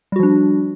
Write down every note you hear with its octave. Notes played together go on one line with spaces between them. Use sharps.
F3 G3 D4 F#4